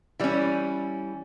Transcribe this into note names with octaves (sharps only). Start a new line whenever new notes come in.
E3 G3 C#4